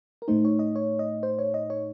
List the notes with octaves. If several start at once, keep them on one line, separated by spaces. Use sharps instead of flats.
A#4
A2 A3 D#4 C5
C#5
D#5
C#5
D#5
C5
C#5
D#5
C#5